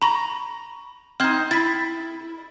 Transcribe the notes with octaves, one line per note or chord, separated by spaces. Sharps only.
A#5 B5 C#6 A#6
C4 D#4 F6 G#6
E4 A6 B6